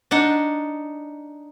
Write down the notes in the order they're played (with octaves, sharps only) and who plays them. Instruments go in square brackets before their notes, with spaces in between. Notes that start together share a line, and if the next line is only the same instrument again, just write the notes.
[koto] D4 D#4 F#5